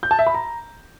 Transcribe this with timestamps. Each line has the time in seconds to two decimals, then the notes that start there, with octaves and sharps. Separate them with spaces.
0.03 G6
0.11 A5
0.19 E5
0.27 B5
0.34 A#5